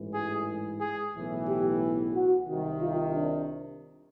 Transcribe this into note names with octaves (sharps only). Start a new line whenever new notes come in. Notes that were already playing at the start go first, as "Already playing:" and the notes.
Already playing: A1 G#2 E3
G#4
G#4
B1 A2 E3
G4
F#4
C2 C3 D#3
F4
D4